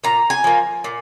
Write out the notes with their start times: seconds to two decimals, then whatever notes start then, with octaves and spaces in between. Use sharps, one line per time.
0.04 A#2 A#5
0.30 G#5
0.44 F3 A#3
0.84 A#2